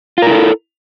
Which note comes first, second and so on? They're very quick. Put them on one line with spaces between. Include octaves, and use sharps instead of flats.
F4 A#4 E4 A4